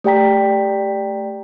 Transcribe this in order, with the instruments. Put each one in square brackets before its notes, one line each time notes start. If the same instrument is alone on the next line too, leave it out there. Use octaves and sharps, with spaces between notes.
[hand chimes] A3 G4 D5 G5 A#5 B6